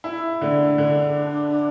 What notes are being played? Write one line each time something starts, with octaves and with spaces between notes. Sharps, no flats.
E4
D3 A3
D3 D4